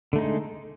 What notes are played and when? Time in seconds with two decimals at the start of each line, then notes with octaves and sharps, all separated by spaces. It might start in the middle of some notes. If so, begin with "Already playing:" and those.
0.13 D3
0.16 A3
0.18 D#4
0.21 G#3